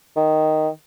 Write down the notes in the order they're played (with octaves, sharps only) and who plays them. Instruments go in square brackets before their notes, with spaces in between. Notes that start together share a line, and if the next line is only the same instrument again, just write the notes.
[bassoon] D#3